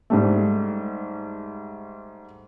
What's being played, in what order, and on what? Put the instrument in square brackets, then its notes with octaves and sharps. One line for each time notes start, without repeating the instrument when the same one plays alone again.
[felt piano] G#2 G3 A3